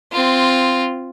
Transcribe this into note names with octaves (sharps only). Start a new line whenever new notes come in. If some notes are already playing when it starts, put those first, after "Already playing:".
C4 F4